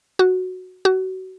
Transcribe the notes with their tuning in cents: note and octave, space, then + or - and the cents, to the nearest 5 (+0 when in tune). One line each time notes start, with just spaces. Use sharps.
F#4 -5
F#4 +25